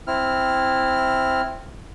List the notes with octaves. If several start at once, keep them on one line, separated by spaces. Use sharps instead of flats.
C4 E4 F6